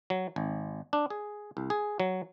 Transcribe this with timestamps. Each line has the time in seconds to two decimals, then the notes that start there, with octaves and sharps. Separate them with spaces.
0.10 F#3
0.36 G#1
0.93 D4
1.10 G#4
1.57 C2
1.70 G#4
2.00 F#3